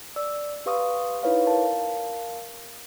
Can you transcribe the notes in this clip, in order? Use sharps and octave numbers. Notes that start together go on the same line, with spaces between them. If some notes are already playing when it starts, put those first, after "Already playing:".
D5 E6
G4 B4 F5 C6 C#6 D#6
D#4 E4 B4 C#5 F5
A#4 F5 A5